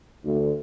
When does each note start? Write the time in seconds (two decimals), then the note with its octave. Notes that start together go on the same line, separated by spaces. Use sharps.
0.24 D2